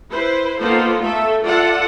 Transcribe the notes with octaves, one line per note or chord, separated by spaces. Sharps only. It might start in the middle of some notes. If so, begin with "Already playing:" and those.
E4 B4 C5
A#3 B3 D#4 F4 A4 C5
A3 A4 E5
F4 A4 D5 E5 F#5